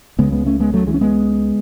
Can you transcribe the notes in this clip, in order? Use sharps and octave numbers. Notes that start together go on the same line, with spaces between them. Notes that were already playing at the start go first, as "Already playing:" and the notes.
C#2 C#3 G#3 B3
G#3 B3
A3 C#4
G#3 B3
F#3 A3
E3 G#3
C#4
G#3 B3